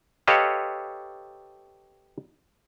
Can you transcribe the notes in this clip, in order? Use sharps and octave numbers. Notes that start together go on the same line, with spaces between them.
G4 A4 B4 C#5 D#5 F5